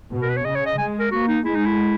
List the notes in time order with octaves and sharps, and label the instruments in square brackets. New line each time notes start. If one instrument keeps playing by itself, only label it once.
[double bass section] B2
[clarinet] A#4
B4
C#5
[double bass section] C#3 [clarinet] D#5
[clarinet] C#5
D#5
[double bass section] G#3 [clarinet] G#5
[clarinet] A#4
[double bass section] A#3 [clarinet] F#4
[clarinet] D#4
[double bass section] G#3 [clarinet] E4
[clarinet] D#4
E4